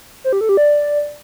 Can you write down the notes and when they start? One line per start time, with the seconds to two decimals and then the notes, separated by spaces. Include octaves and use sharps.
0.24 C5
0.33 G4
0.41 A4
0.49 G4
0.57 D5